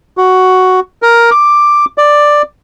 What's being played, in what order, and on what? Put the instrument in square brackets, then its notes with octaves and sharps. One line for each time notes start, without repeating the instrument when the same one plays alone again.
[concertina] F#4
A#4
D6
D5